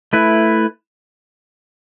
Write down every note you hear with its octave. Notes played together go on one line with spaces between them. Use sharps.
A3 E4 B4